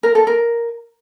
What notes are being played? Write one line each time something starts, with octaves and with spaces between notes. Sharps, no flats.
A#4
A4
A#4